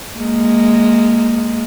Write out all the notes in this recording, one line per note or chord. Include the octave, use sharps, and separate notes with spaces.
G#3 A#3